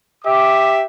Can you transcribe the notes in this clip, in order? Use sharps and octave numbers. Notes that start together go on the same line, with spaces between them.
G4 E5 D6